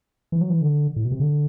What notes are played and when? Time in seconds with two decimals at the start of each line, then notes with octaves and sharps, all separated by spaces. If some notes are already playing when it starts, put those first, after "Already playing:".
0.32 E3
0.41 F#3
0.50 E3
0.61 D3
0.96 A2
1.05 B2
1.12 C3
1.20 D3